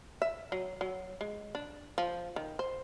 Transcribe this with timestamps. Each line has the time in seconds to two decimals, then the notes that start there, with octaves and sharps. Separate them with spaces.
0.22 E5
0.52 F#3
0.81 F#3
1.21 G#3
1.55 D4
1.98 F3
2.36 D#3
2.59 C5